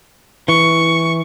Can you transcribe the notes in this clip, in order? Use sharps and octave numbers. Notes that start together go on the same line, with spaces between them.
E3 C#6